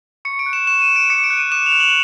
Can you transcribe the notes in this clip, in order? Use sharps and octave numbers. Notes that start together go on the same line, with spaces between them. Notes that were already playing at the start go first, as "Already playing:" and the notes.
C#6 C#7
D7
F#6
E7
C#6 E7
D#7
F#6
D7
D6 C#7
D7
F#6
D#7
D6 E7
F7
F#6
F#7